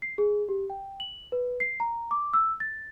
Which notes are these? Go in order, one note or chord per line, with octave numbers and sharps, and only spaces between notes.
C7
G#4
G4
G5
F#7
B4
C7
A#5
D6
E6
A6